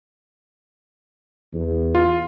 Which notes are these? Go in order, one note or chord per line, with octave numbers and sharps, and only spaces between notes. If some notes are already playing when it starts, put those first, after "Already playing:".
E2
F4